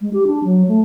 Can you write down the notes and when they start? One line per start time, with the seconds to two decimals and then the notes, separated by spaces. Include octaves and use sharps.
0.01 G#3
0.14 G4
0.27 D4
0.44 F#3
0.68 A3